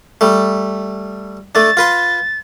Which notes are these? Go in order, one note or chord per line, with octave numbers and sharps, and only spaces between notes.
G3 A3
A3 D4 A6
F4 B4 C6